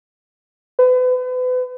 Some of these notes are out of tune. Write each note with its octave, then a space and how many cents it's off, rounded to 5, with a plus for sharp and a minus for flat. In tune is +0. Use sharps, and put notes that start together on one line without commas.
B4 +35